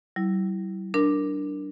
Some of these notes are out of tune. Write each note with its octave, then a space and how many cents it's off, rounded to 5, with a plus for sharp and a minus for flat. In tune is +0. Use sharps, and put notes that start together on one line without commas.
G3 -45 E4 +0
D4 +0 A#4 +0